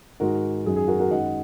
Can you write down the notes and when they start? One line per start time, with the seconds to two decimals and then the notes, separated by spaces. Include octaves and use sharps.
0.20 G#2 D#3 G#3 F#4 A#4
0.65 F#2 D#3 F#3 G#4
0.76 G#4
0.88 F#4 A#4
0.99 F#4 A#4
1.11 F#2 D#3 G#3 D#5 F#5